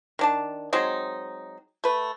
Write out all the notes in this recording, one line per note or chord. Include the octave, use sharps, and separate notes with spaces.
D#3 D4 A5
F#3 G#3 C4 D#4
A3 B4